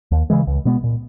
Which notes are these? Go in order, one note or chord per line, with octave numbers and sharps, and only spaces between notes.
D#2
C#3 E3 G#3
C#2
B2 G#3 B3
A#2